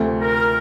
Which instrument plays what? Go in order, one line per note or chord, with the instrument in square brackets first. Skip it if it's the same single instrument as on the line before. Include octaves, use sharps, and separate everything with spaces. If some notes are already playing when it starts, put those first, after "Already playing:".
Already playing: [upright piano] D2 C3 F3 A3
[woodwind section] A#4